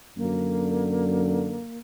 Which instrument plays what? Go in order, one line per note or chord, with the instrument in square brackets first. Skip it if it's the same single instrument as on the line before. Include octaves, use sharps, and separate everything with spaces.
[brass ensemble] F#2 D3 [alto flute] A#3